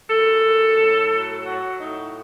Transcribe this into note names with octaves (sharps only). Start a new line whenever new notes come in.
F#2 A4
F#2
A2
F#3
F#3 F#4
A2 D#4